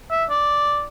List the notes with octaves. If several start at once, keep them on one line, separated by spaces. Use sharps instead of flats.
E5
D5